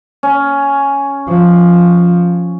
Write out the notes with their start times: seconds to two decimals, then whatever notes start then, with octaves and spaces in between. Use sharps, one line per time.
0.23 C#4
1.28 F3